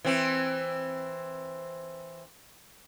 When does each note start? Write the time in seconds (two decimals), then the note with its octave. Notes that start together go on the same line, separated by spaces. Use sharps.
0.04 E3 C4